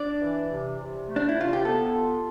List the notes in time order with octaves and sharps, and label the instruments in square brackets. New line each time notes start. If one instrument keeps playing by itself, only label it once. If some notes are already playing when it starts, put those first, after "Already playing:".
Already playing: [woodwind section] D4 [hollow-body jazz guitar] D5
[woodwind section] E3
C3
C3
A3
[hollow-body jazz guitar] D4
E4
[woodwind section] C3 [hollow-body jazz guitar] F4
[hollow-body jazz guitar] G4
[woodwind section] B3 [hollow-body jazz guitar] A4
[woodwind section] F4